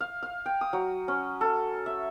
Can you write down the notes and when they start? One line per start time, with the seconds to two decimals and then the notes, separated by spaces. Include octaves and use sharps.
0.01 F5
0.23 F5
0.46 G5
0.61 D#6
0.73 F#3
1.08 C#4
1.41 A4
1.86 E5